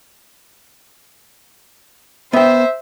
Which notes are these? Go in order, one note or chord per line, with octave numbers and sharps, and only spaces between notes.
B3 C5 E5 G5